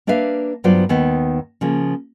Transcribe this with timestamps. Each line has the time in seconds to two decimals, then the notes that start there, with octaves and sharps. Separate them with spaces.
0.07 A#3 D4 B4 E5 F5
0.64 G2 F#3 B3 F4 C5 D5
0.89 D#2 D#3 B3
1.61 C#3 F3 A#3